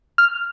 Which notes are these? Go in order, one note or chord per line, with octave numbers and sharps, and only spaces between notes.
F6